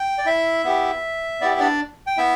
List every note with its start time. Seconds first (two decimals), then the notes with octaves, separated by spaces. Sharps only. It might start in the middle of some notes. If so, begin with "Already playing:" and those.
Already playing: G5
0.18 D5
0.26 E4 E5
0.65 B3 E4 G4
1.41 B3 E4 G4 D5
1.51 E5
1.60 D4 D5
2.07 G5
2.18 B3 E4 E5